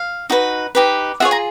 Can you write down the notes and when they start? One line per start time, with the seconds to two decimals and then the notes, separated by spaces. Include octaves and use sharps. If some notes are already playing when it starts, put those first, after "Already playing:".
Already playing: F5
0.30 D#4 F#4 B4
0.75 D#4 G4 B4
1.20 F4 G#4 C#5 E5 F#5
1.31 G#5 A#5